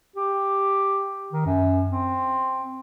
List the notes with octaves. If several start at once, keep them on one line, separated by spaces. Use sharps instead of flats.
G4
D#3
F#2
C4